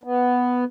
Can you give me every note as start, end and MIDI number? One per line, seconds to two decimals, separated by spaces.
0.04 0.64 59